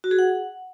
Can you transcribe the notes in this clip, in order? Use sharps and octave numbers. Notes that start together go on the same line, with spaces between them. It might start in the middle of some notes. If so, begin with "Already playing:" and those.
F#4
G#4
F#5